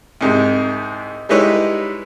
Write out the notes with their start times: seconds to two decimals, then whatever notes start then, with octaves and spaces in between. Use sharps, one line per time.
0.21 C2 G#2 C3
1.29 G3 G#3 D#4 E4 B4 C#5